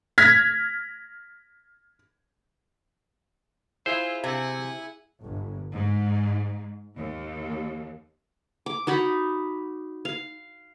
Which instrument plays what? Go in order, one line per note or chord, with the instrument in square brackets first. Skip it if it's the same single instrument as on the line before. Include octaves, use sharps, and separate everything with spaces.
[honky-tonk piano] F6 G#6 A#6 B6
[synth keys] E4 G#4 E5 [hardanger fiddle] F4 [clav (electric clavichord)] C5
[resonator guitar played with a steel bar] C3 [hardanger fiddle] F#5 G#5
[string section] G1
G#2
D#2
[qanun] D6
D#4 F#4 D5 B5
F5